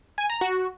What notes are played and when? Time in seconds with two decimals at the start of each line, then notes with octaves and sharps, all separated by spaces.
0.18 G#5
0.30 A#5
0.41 F#4